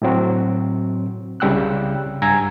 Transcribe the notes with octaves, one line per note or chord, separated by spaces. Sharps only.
A2 F#3 C4 F#4
C2 C#3 G3 G5 E6 F#6
G2 G#5 A#5 E6 G#6